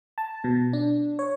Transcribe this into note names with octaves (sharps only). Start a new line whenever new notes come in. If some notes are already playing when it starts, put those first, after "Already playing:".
A5
B2
D4
C#5